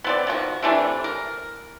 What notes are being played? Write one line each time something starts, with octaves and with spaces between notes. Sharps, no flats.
B3 C4 D5
D#3 F3 F#4
C3 E3 A3 D4
A#4